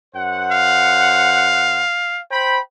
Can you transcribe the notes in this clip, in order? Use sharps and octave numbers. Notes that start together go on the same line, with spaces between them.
F#2 C5 F#5
F5
C5 G5 B5